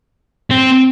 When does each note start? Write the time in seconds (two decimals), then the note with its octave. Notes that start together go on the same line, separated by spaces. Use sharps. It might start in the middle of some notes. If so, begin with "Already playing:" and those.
0.50 C4